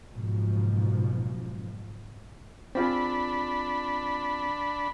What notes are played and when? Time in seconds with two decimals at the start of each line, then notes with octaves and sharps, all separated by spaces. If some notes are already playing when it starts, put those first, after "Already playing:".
0.12 F#1 G#2 B2 F3
2.75 C4 D4 F4 G#4 B5